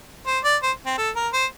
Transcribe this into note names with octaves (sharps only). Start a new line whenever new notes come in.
C5
D5
C5
C4
A4
A#4
C5